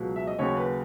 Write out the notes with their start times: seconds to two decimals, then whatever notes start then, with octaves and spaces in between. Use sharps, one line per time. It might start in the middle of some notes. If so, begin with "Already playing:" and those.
Already playing: C#2 B2 F#3
0.16 E5
0.27 D#5
0.38 D#2 C#3 F#3 C#5
0.57 B4